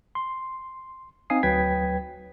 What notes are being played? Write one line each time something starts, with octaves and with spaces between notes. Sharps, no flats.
C6
C4 D#4 F5 G#5 D#6 C7
D2 F#3 B4 G5 G#6 B6